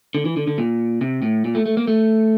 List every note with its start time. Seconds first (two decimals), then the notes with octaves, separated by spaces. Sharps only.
0.15 D3
0.25 E3
0.37 D3
0.47 D3
0.58 A#2
1.01 C3
1.22 A2
1.45 A#2
1.55 A3
1.66 A3
1.77 A#3
1.87 A3